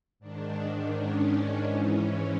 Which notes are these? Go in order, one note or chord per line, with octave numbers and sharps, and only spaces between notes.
G#2 D#3 D4
C#4
G#2 E3